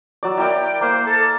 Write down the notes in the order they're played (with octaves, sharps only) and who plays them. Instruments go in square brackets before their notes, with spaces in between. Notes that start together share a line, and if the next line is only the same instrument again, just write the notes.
[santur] F#3 D5
[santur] E4 A#4 D5 [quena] G5
[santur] A#3 [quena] C5
[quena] A4